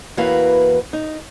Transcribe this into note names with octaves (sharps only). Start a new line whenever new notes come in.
E2 E3 A#3 F#4 B4 F5
D#4